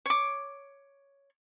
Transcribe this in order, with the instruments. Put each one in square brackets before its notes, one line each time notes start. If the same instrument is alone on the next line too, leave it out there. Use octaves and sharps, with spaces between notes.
[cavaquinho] C#5 D6